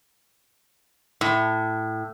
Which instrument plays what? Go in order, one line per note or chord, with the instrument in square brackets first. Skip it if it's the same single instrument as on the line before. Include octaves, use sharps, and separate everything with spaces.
[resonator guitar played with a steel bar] A2